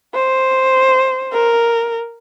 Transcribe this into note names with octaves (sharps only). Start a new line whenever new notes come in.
C5
A#4